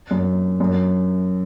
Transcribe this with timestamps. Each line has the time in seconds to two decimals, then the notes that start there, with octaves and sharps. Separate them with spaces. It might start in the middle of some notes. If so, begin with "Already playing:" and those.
0.11 F#2
0.60 F#2